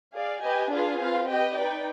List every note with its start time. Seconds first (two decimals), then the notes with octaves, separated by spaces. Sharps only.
0.15 G#4 D5 F5
0.43 G4 B4 D#5 G#5
0.71 D4 F4 G#4 B4 F5
1.00 C4 F4 B4 F5
1.28 G4 B4 D#5 G5
1.56 D#4 B4 D5 G5